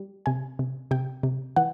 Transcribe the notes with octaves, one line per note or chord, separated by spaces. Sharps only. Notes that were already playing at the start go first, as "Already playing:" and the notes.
Already playing: G3
C3 G#5
C3
C3 G5
C3
E3 F#5